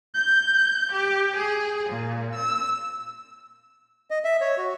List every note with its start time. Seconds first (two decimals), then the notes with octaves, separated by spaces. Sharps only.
0.14 G6
0.92 G4
1.35 G#4
1.89 A#2
2.35 E6
4.11 D#5
4.24 E5
4.41 C#5
4.57 F#4